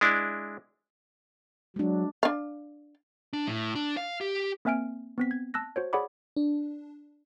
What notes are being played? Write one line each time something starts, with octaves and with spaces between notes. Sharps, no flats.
G#3 D4 E4
F#3 G#3 D4
D4 F5
D4
A2
D4
F5
G4
A#3 C4 E5 G#5 F6 D7
B3 C4 B6
G#6
A5 E6 F#6 A#6
F#4 C5 C#5
G#4 C#5 D5 F#5 B5 D6
D4